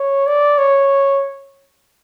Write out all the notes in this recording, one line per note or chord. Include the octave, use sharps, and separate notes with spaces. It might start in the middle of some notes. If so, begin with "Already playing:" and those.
Already playing: C#5
D5
C#5